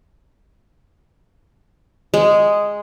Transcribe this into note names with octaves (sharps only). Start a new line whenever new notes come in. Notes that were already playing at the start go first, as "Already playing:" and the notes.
G#3